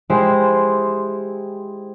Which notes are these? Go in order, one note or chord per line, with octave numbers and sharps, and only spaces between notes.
G#3 E4 G4 C5